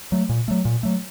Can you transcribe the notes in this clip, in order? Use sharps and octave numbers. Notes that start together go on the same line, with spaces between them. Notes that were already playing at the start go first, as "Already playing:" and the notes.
F#3 A3
A#2
F#3 A3
A#2
F#3 A3